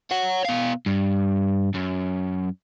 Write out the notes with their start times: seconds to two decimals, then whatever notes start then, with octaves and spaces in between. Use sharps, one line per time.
0.11 C#5 F#5
0.45 B2 F5
0.86 G2
1.74 F#2